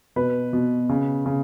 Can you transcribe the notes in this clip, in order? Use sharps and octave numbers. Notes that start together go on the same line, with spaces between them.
B2 B4
B2
C#3
C#3